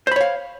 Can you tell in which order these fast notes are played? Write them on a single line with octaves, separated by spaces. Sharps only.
C5 B5 C#5 F5